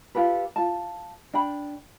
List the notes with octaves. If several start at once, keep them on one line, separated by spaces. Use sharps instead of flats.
F4 G4 A4 B4
F4 A5
D4 G5 B5